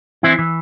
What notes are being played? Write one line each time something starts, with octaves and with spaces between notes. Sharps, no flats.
E3 C4 E4
E3